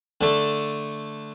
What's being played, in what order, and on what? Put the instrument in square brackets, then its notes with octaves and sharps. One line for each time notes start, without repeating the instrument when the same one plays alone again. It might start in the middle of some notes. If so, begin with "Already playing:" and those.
[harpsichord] D3 A3